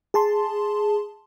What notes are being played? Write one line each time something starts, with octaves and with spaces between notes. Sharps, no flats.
G#4 A5 C6